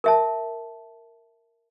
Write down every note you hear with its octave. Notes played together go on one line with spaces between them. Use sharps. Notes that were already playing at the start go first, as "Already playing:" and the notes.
A#4 E5 A5